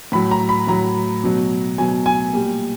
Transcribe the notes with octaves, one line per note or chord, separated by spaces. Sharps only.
A2 F#3 B5
A#5
B5
A2 F#3 A#5
B2 F#3
B2 F#3 G#5
G#5
A#2 G3